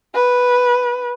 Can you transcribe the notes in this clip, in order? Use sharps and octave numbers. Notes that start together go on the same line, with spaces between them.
B4